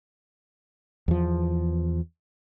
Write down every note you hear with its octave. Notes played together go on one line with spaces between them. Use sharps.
E2 F3